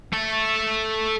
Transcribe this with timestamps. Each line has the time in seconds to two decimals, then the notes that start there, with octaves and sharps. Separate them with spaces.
0.13 A3 A4